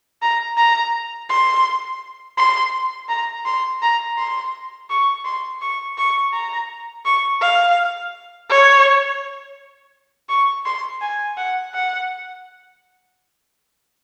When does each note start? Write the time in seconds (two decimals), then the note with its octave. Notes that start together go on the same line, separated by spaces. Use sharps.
0.22 A#5
0.57 A#5
1.30 C6
2.38 C6
3.09 A#5
3.46 C6
3.82 A#5
4.18 C6
4.90 C#6
5.25 C6
5.62 C#6
5.98 C#6
6.33 A#5
7.05 C#6
7.41 F5
8.50 C#5
10.29 C#6
10.66 C6
11.02 G#5
11.37 F#5
11.74 F#5